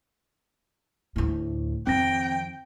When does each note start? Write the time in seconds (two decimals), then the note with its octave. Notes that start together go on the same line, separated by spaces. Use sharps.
1.16 D2 A2
1.87 F2 D#3 C4 G5 A#6